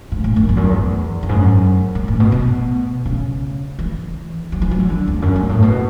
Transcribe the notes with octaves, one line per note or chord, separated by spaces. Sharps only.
G#2
A2
F#2
E2
F#2
E2
F#2
G#2
F#2
G#2
A2
B2
B2
C#3
E3
F#3
E3
F#3
E3
D3
E2
F#2
G#2
A2
B2